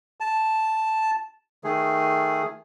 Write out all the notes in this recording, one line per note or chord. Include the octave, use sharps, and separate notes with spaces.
A5
D#3 A3 G#4